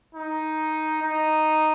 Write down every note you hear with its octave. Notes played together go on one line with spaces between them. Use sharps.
D#4
D#4